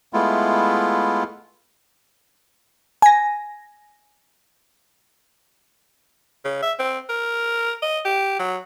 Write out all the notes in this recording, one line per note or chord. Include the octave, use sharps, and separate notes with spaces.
G#3 A3 B3 E4 F4
G#5 A#6
C#3
E5
C4
A#4
D#5
G4
F#3